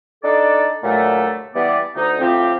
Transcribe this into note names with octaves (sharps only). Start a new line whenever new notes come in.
D4 D#4 A4 D5
G2 A#2 D3 F#3 A3
E3 G3 B3 D5
D2 D#4
A2 F3 C4 G4